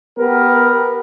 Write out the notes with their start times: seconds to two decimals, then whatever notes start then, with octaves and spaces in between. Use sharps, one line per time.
0.18 B3 G4 A#4 B4